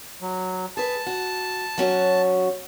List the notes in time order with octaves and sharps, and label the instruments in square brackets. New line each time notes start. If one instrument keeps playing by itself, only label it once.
[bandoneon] F#3
[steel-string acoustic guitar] G#4 B4 [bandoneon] A5
[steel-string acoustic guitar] F#4
F#3 C#4 F#4